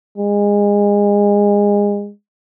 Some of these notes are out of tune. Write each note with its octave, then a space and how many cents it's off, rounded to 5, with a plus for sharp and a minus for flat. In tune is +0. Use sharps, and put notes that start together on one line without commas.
G#3 -25